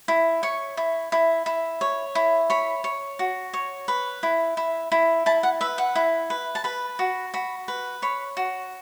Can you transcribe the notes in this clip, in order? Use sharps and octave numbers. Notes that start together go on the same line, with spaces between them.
E4
C#5 C#6
E4
E4
E4
C#5
E4
C#5 B5
C#5
F#4
C#5
B4 B5
E4
E4
E4
E4 A5
F#5
B4 E5
F#5
E4
B4
A5
B4 B5
F#4
F#4 B5
B4
C#5 B5
F#4